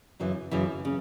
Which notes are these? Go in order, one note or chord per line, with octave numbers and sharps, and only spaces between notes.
F#2 C#3 E3
F#2 C#3 E3
C#3